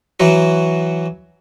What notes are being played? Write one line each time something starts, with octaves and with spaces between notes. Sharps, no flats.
E3 F#3 F#4